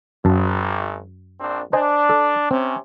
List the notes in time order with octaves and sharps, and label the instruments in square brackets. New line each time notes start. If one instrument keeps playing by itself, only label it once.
[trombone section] G#1 [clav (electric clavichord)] F#2 A5
[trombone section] A#1 C4 D4
[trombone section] D4 [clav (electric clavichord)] C5 D#5 G#5
[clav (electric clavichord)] A4
[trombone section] C3 C#4 [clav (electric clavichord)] C4